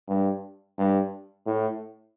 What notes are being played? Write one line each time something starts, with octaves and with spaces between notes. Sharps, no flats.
G2
G2
A2